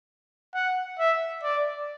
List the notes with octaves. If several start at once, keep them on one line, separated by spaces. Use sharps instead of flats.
F#5
E5
D5